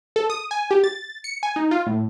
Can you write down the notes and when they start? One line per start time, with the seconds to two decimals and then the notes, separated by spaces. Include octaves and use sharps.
0.16 A4
0.30 D#6
0.51 G#5
0.71 G4
0.84 A6
1.24 C#7
1.43 G#5
1.56 D#4
1.71 F4
1.87 A2